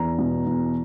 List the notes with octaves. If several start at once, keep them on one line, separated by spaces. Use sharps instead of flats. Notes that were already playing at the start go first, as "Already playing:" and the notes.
Already playing: E2 A#5
B2
E2